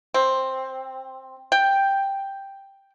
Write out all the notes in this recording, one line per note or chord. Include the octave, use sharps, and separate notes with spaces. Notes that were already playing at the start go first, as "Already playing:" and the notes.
C4
G5